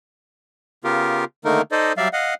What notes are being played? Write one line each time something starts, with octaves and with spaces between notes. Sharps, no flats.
C#3 B3 F4 G4 A#4
D3 D#3 A3 A#3 D#4 A#4
D#4 A4 C5 D5 D#5
F#3 G3 D5 E5 F5
D#5 F5 F#5